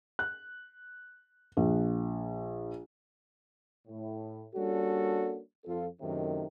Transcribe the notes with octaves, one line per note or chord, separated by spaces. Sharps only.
F#6
A#1
A2
G3 A#3 C#4 D4 F#4 A4
F2 F4 A4
F#2 A2 C3 D#3